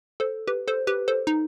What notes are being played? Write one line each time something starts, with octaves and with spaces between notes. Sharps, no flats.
A4 C5
G4 B4
A4 C5
G4 B4
A4 C5
D#4